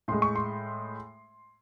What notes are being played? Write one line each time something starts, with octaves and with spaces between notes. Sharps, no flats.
A2 G#3 C6
C#6
C6